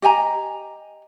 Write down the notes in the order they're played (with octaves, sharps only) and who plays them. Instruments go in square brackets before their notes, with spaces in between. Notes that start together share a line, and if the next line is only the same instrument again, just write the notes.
[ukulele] G4 D#5 G#5 A#5